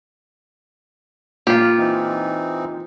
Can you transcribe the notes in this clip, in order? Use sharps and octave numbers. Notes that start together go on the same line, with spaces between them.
A#2 F4 G4
E3 C4 D#4